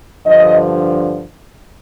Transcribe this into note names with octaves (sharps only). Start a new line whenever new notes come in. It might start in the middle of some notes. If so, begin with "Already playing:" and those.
G2 D3 F3 D#5